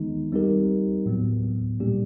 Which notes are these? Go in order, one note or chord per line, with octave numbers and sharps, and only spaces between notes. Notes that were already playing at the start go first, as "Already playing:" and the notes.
Already playing: D#3 G#3 B3 D#4
G3 C4 D#4 G4 A#4
A2 F#3 B3
A#2 G3 A#3 D4 G4